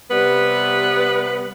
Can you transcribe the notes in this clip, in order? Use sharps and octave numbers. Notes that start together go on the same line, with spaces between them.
C3 G3 B3 B4